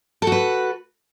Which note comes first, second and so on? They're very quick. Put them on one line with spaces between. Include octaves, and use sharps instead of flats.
A4 F#4 B4